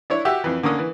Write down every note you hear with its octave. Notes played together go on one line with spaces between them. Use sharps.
D4 E4 C#5
F#4 G4 E5
F2 E3
D3 A#3 C#4 D#6
E3